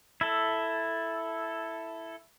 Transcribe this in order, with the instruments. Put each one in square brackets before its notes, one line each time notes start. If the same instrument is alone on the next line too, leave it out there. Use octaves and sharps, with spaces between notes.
[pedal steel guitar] E4 A4